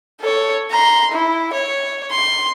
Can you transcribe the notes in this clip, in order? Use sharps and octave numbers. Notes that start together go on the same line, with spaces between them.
A4 C#5
A#5 C6
E4
C#5
C6